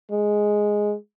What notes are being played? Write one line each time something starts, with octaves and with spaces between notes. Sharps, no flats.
G#3